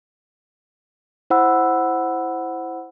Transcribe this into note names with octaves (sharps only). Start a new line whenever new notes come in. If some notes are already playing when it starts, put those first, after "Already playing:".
E4 C5 F#5 B5 E6